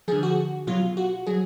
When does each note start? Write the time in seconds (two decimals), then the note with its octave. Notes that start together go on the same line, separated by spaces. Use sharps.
0.08 D3 F3 G#4
0.23 F#4
0.67 B2 F#3 F4
0.97 F#4
1.27 F#3 G#4